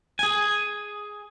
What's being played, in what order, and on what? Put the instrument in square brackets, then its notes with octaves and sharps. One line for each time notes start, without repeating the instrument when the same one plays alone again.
[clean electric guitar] G#4 G#5